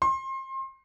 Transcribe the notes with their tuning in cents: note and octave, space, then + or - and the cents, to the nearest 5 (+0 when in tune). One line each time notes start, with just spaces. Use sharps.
C6 +30